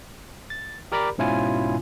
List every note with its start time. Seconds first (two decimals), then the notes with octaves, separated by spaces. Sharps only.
0.50 A6
0.92 G4 A#4 D5 A#5 B5 D6
1.18 G#2 B2 C#4 E4 F4 G#5